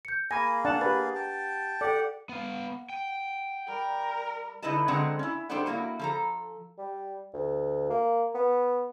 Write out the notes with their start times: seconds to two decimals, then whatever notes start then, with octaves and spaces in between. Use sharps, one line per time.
0.05 G6 C#7
0.31 A#3 G#4 F5 G#5 B5 A#6
0.65 D4 D5 F#5 A5
0.81 G4 B4 F#5 A6
1.15 G5 A5
1.81 G4 A4 D5 F#5 G5
2.29 B3 F5 F#5
2.89 G5
3.68 G3 A#4 D5
4.62 D3 D#4 E4 B4 D#5 A5
4.88 D3 F#3 G#3 C4 D4 F#5
5.19 C#4 E4
5.49 G3 D4 A4 C5 D5 F#5
5.66 F#3 A#3 E4 F#4
5.99 F3 A4 A#5
6.79 G3
7.34 D2
7.90 A#3
8.35 B3